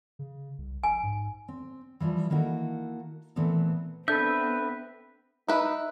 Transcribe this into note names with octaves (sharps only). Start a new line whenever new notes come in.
C#3
C2
A#1 G#5
G#2
C4
E3 F3 G3
D#3 A#3 E4 F#4 A4
A#2 E3 A3 B3 C4
B3 C4 D4 A4 B4 E5 G6
D#4 E4 B4